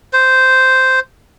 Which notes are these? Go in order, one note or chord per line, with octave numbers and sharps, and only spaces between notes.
C5